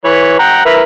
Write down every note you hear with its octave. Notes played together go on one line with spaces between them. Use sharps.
E3 B4 C#5
F#5 G5 A#5
E4 A#4 B4